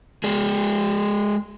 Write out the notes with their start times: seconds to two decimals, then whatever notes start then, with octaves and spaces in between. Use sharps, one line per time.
0.24 G#3 G#4 D5